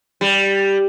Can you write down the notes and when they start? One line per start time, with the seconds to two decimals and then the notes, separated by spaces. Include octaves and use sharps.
0.21 G3